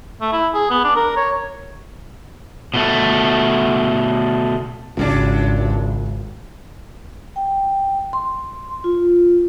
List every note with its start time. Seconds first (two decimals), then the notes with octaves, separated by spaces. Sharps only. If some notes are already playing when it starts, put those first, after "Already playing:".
0.21 A3
0.32 E4
0.54 G#4
0.70 B3
0.84 D4
0.95 A#4
1.16 C#5
2.74 B2 A3
4.97 G#1 C#2 G2 F#3 D4
7.36 G5
8.13 C6
8.84 F4